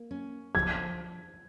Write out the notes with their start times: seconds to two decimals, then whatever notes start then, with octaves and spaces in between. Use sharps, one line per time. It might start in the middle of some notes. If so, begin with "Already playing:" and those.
Already playing: A#3
0.11 C#4
0.55 F3 G#6